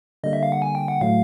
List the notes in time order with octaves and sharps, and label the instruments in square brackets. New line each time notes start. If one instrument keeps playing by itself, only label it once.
[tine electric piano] D3 G3 A#3 [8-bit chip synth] D#5
[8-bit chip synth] E5
F5
F#5
G#5
G5
F#5
[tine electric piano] A2 F#3 A3 [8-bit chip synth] F5